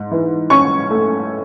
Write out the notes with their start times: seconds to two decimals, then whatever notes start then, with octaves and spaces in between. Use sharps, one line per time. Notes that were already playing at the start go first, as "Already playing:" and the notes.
Already playing: G#2
0.11 E3
0.50 C#4 C#6
0.91 A3